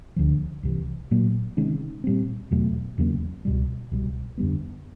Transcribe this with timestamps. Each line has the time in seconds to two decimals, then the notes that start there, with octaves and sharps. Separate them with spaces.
0.16 D2 D3 F3
0.63 C2 C3 E3
1.11 A#2 F#3 A#3
1.57 C3 D#3 G#3 C#4
2.04 A#2 G3 C4
2.51 E2 B2 F#3 A3
2.98 E2 C#3 F#3 A#3
3.45 C#2 B2 G3
3.92 C2 B2 G3
4.38 F2 D3 G3 B3